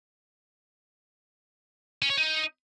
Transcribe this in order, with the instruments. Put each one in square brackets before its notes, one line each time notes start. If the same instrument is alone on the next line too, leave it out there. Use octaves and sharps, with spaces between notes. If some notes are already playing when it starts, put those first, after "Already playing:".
[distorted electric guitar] C#4
C#5
D#4